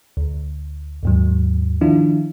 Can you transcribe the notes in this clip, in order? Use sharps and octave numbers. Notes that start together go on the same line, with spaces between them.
D2
D#2 G#2 F#3
D#3 F3 D4 E4 F4